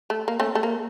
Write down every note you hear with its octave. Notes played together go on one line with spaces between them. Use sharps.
A3
A#3
A3 C#4
A3
A#3